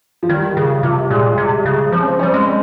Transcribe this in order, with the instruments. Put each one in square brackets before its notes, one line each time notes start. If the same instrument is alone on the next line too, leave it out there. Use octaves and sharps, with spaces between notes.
[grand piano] F3
[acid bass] D#3 [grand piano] G3
[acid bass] C#3
[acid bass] C3 [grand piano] F3
[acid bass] A#2 [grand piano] G#3
[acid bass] C3
C#3
[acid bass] F3 [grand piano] C4
[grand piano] C#4
C4
[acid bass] G3 [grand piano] C#4
[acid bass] G#3
[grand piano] C4